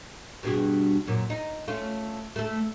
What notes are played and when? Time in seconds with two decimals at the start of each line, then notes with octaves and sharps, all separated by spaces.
0.43 G2 B2 G#4
1.07 F#2 A#2
1.30 D#4
1.67 A3 C#4 F4
2.36 A3 A4